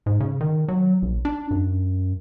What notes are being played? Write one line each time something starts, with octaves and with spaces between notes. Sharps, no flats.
G#2
C#3
D#3
F#3
A#1
D4
F#2